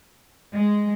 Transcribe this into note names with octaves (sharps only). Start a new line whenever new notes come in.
G#3